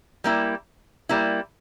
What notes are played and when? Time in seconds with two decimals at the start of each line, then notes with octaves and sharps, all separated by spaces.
0.24 G3 A#3 E4
1.09 G3 A#3 E4